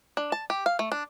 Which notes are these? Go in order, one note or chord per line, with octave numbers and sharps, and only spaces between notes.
D4
A5
G4
F5
A3
D4